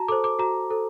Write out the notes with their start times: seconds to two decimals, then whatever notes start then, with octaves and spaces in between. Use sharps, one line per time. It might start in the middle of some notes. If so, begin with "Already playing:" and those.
Already playing: F#4 A5 A#5
0.08 A4 C5 D6
0.24 D6
0.39 F#4 A#5
0.70 A4 C5